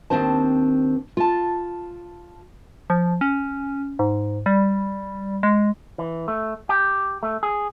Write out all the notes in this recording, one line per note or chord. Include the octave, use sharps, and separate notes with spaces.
D#2 A3 C4 D4 C5 A5
F4 A5
F3
C#4
G#2
G3
G#3
E3
A3
G4
A3
G#4